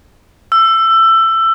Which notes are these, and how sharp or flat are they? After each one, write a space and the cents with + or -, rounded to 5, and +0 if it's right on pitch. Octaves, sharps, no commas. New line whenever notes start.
E6 +20